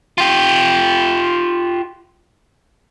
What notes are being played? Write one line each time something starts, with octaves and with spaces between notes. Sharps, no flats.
F4 G4